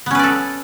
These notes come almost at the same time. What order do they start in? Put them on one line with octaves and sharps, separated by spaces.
B3 C#4 B4 D5 A4